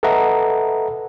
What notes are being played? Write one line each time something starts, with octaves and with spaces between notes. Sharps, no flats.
A4 B4 D#5 E5 F#5 A#5